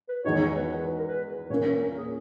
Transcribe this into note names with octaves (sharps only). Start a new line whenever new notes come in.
B4
E2 D#3 G#3 D#4 F#4 C#5
B4
B4
B4
A#4
B4
A#2 A#3 C#4 C#5
B4
A#4
G#4